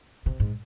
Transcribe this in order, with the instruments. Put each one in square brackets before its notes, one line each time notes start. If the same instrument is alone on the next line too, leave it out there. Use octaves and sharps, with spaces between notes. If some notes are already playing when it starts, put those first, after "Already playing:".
[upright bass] C3
G#2